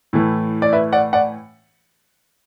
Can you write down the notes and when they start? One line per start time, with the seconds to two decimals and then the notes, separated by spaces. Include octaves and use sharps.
0.13 A2 E3 A3
0.62 D5
0.73 B4 E5
0.93 D5 F#5
1.13 D5 F#5